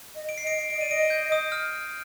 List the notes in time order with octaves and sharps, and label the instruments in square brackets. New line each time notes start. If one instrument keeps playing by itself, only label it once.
[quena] D#5
[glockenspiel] D7
C7
[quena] D#5
[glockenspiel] D7
[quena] D#5 [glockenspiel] D7
[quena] D5 [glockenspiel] D#7
[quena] D#5 [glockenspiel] D7
[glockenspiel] G6
D#6
F6